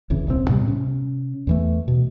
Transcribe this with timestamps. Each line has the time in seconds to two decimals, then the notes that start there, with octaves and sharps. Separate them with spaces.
0.10 F1 C2 C#3 E3
0.27 D#1 C2 C#3 C4
0.49 A2 C3 G3 B3
0.66 C3 C#4
1.47 E2 E3 A3
1.88 B2